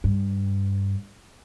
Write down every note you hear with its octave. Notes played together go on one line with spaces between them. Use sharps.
G2